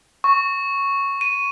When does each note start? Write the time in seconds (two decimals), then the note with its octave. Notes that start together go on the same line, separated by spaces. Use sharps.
0.24 C#6
1.21 D#7